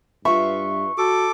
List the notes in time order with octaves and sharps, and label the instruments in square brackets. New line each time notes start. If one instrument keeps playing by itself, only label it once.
[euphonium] G2 [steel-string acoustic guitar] F4 B4 E5 [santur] C#6
[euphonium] F#4 [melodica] A4 D6